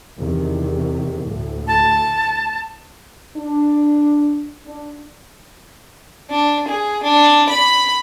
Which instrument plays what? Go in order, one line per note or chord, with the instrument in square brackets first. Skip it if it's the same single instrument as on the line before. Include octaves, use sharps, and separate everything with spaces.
[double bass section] E2 C3 D#3
D2 A2 D3
[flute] A5
[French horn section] D4
D4
[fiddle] D4
G#4
D4
B5